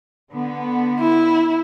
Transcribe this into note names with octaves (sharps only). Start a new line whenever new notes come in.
D3 B3
E4